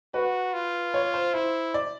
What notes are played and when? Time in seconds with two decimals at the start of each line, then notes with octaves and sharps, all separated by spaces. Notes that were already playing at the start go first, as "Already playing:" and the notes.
0.14 F#4 B4
0.53 F4
0.94 C#5
1.14 C5
1.34 E4 C5
1.74 D5